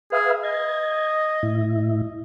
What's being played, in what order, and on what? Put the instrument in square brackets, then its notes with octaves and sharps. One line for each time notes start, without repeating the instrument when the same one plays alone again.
[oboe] G#4 [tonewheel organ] B4 E5 F5
[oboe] D#5 [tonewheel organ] G#6
[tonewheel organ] A2 E4